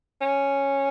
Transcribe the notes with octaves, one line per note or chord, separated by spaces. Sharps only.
C#4